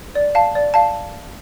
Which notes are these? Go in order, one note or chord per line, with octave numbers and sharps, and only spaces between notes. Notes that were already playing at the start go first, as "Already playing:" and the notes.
D5
F5 A5
D5
F5 A5